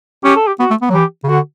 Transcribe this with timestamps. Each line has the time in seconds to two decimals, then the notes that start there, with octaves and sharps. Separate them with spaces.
0.24 C#4 G4
0.36 A4
0.47 G4
0.60 B3 F#4
0.70 A3
0.82 B3
0.90 F#3
0.93 E3 G4
1.24 C#3
1.28 D3 F#4